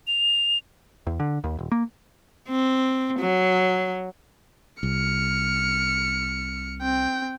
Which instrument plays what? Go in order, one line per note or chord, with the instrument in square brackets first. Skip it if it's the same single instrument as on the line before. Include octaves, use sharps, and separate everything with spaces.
[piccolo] F7
[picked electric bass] E2
D3
D#2
D#1
A#3
[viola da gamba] C4
F#3
[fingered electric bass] C2 [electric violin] F6 C#7
[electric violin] C4 G5